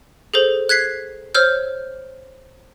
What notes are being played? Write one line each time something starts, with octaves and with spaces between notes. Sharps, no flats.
G#4 A4 C5
F#6 G#6 B6 C7
C5 C#5 E6 F6 G6